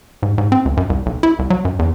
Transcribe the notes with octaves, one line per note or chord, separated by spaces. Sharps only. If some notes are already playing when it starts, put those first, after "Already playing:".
G#2
G#2
C4
C#2
F#2
C2
B1
E4
C2
F#3
F#2
E2